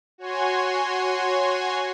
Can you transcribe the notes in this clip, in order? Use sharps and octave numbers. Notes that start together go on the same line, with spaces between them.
F#4 C#5 G#5 C6